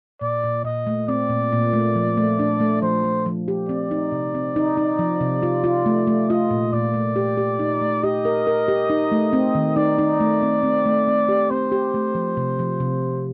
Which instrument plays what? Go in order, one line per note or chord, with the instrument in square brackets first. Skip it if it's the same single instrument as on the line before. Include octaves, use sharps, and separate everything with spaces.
[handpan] A#2 [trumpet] D5
[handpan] A#2
[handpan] A#2 [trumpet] D#5
[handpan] A3
[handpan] C4 [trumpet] D5
[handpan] A#2
A#2
A3
F3
A3
D4
A3
[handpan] F3 [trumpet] C5
[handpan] A3
F3
G4
[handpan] C4 [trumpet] D5
[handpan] D#4
C3
C4
D#4
D#4
F3
C3
F4
F4
A3
A3
[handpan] F4 [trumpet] D#5
[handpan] A#2
[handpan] A#2 [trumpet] D5
[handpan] A3
G4
G4
D#4
A3
[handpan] G4 [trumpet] D#5
[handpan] A#4
A#4
G4
D#4
A3
C4
D#3
[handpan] D#4 [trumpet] D5
[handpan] D#4
A3
C4
C4
A3
C4
G4
[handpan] C4 [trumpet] C5
[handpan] G4
A3
F3
C3
F3
C3